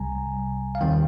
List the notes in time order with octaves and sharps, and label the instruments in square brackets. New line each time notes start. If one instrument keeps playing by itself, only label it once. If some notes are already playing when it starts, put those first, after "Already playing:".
Already playing: [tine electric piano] C2 C3 G3 G#5 A#5
F5
D#2 D#3 G3 C4 G5